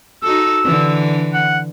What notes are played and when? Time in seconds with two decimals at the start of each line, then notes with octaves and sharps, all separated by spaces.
0.23 D#4 F#4 A4 E6
0.64 D3 E3
1.34 F#5